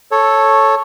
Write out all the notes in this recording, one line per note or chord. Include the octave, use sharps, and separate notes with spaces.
A4 C#5